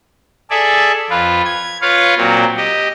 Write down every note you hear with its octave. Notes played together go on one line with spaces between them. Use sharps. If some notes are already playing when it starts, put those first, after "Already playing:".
G#4 A4 D5 E5
F2 F4 B4
G#6
F4 B4 C#5 F5
A#2 F#3 C4
G4 D#5